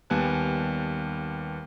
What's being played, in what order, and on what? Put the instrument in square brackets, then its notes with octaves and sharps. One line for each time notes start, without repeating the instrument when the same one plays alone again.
[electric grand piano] D#2 G3 B3 G#5 A5 F#6